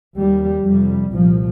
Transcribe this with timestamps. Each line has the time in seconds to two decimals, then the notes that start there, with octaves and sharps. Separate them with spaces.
0.18 D#2 G3
0.65 F2 C3 G3
1.12 C2 A#2 F3